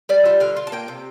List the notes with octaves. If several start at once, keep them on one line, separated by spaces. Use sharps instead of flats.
G3 D5
F4 E5
D3 F5
F4
A5
A#3 G5
C3